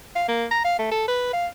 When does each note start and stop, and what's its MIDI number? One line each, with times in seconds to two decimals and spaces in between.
0.16 0.23 77
0.28 0.46 58
0.51 0.63 82
0.64 0.75 77
0.79 0.89 57
0.91 1.06 69
1.08 1.29 71
1.33 1.47 77